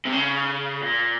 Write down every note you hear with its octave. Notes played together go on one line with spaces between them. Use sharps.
C3
C#3
A#2